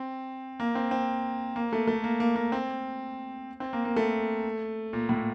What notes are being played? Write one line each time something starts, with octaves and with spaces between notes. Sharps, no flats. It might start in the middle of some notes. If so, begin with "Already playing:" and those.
Already playing: C4
A#3
C4
C4
A#3
A3
A3
A#3
A#3
A#3
C4
C4
A#3
A#3
A3
A#2
A2